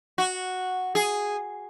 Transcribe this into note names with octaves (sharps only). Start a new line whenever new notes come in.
F#4
G#4